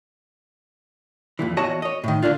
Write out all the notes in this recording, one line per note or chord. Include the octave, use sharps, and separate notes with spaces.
F2 A#2 E3
E2 F#4 C#5 D#5 A5
C#5 D#5
A2 D#3
C#2 D3 D4 F4